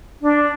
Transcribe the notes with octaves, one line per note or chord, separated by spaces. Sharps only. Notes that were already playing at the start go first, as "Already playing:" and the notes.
D4